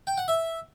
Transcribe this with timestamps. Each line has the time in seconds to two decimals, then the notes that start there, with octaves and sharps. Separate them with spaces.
0.07 G5
0.18 F#5
0.28 E5